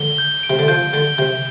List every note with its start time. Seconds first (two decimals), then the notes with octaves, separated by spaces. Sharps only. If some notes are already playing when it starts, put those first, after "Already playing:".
Already playing: D3 G7
0.18 G6
0.43 D7
0.50 C3
0.59 D3
0.68 F3 G6
0.93 D3 G7
1.18 C3 G6